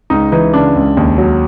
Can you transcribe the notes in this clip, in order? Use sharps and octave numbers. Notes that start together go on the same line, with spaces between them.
C#2 D#4
E3 D#4
C#3 D4
C#2
D#2
F#3